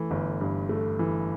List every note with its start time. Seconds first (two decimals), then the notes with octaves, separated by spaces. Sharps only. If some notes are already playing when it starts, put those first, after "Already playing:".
Already playing: E3 A3
0.11 G1
0.41 G2
0.69 A3
0.99 E3